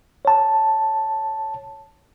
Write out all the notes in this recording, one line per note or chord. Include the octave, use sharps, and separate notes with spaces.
C#5 A5